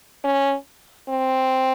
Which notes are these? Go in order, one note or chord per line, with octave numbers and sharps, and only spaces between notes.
C#4
C4